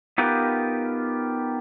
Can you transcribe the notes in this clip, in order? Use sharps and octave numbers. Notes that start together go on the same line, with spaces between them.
B3 D#4 F4 G4 A#4 B4